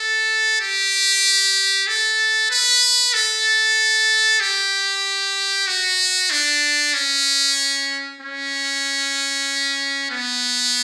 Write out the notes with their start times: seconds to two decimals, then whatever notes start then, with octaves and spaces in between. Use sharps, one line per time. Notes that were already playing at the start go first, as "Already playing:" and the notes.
Already playing: A4
0.61 G4
1.87 A4
2.51 B4
3.13 A4
4.40 G4
5.67 F#4
6.31 D4
6.94 C#4
8.21 C#4
10.11 B3